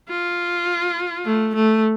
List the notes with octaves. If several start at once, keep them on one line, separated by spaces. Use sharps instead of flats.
F4
A3
A3